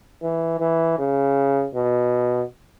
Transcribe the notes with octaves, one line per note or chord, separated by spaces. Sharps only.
E3
E3
C#3
B2